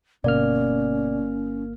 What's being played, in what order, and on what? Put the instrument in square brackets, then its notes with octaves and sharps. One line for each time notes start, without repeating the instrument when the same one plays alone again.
[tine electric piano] G1 A#3 F6 [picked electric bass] B2 B3 [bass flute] C#4 [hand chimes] D5